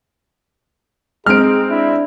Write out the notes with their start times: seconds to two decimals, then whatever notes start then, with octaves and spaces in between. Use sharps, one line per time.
1.26 G#3 C4 D#4 G#4 F6 D7
1.70 D4 E4